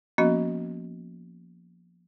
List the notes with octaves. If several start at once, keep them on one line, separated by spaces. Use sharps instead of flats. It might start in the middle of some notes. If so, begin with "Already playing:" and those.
F3 A#3 B3 C#4 F#4 D#5